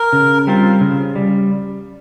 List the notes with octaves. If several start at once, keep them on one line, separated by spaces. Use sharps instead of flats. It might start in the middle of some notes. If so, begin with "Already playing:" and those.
Already playing: A#4
C#3
G3 C4 F4
C#3
G3